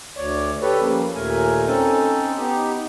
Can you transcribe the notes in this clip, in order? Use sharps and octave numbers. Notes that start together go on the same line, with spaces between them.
D2 C#5 D5
G4 A4 B4 C#5
F3 G3 A#3 C#4
D#2 A#2 A3 A#4 G#5
C4 C#4 D#4 A4
B3 D#4 G4